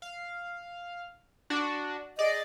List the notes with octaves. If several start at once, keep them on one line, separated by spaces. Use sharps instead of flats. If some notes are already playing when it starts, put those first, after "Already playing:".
F5
D4 F#4
G#4 D5 D#5